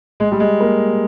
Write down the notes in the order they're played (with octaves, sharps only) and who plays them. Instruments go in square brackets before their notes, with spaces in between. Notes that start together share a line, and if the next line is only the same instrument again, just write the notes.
[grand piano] G#3
G3
G#3
A#3